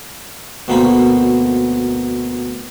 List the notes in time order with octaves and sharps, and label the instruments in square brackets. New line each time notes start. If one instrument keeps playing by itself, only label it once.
[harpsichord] D2 B2 A#3 C4 B5